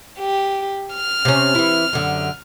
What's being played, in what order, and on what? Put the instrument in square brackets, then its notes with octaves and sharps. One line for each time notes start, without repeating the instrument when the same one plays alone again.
[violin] G4
F6
[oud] C3 C#4
E3 E4
F#2 D3